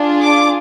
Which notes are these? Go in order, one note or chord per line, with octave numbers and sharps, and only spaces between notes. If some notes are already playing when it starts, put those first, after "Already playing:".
Already playing: D4 F4 G#4
D6